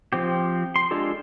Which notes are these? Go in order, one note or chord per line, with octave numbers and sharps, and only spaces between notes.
F3 C4 G4
C6
G#3 D4 F4 G4 A4